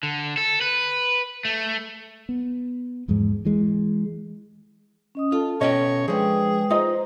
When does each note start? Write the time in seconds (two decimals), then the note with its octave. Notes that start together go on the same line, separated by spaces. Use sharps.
0.03 D3
0.37 A4
0.61 B4
1.45 A3
2.29 B3
3.08 E2 G#2 F3 G#3
3.45 E3 G#3
5.15 C#4 D#5 D#6
5.32 F4 A4 A5
5.61 B2 C#4 C#5 D#5 G5
6.08 F3 G#3 D4 G#4 B4 G5
6.70 D#4 F4 C5 D#5